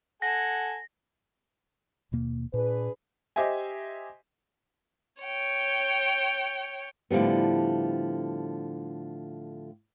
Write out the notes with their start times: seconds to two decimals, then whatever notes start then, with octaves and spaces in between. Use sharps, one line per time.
0.22 A4 F#5 G#5 A#6
2.12 D#2 B2 A#3
2.54 A#2 D4 G#4 B4
3.36 G4 C5 D#5 E5 G#5
5.22 C#5 G5
7.10 A2 D3 F3 G3 B3